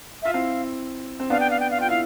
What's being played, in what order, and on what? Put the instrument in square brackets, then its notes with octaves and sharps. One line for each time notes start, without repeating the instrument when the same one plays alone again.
[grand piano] F4 [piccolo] E5
[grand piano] C4 E4 [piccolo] F5
[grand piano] C4
[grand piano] B3 D4 [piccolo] F5
[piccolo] G5
F5
G5
F5
[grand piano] F4 [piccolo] G5
[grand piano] E4 [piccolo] F5